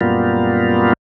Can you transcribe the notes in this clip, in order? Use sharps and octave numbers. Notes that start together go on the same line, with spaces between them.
F#2 A#2 G3 A#3 B3 F4